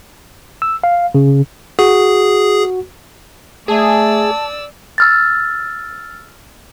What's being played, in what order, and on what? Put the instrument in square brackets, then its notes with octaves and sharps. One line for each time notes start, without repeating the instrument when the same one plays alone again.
[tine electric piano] E6
F5
C#3
[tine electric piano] F#4 [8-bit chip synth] G#4
[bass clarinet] A3 [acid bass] G#4 [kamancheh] D5 E6 [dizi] A5
[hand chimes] E6 F6 A6